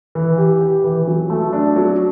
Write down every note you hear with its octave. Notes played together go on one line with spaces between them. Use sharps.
E3
G4
G4
E3
F#3
A3
D4
F#3